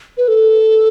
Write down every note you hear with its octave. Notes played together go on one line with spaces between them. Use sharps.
B4
A4